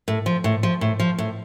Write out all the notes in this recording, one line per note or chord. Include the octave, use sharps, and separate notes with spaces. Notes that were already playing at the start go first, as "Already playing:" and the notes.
A2
F3
A2
F3
A2
F3
A2